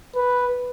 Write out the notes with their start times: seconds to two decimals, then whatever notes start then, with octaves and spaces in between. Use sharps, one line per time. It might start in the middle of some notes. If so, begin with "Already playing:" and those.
0.15 B4